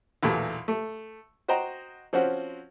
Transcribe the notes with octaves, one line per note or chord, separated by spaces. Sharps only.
B1 E2 A#2 A3
A3
F#4 C5 D#5 G5 A#5
F3 C4 C#4 F#4